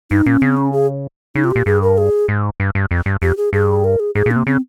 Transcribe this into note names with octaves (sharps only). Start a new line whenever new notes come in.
G2 D#4
A#2 C#4
C#3 C4
C#4
G#4
C#3 D#4
C3 F4
A#2 G4
G2 G#4
A#4
G#4
G#2
G2
G2
F2
G2
F2 G4
G#4
G2 G#4
A#4
G#4
G#2 G#4
A#2
A#3
C3
C#3 C4